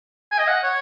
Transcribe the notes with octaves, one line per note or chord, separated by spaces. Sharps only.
G#5
D#5
F#5
C#5